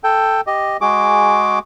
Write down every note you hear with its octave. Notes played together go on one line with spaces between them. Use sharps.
A4 G5
G4 D#5
G#3 F#4 G#4 D6